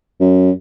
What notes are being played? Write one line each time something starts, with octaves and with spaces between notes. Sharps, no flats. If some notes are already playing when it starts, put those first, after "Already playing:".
F#2